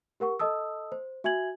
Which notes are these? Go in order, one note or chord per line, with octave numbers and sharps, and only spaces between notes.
G4 A#4 F#5 C#6
A4 D#5 A5 D#6 E6
C5
F#4 E5 G#5 G#6 F#7